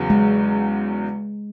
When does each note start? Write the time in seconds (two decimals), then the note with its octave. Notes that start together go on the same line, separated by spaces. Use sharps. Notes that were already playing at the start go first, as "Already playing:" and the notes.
Already playing: E2 C#3 F#3
0.10 G#3